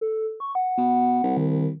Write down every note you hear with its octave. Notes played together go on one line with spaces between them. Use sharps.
A4
C#6
F#5
B2
C2
D#3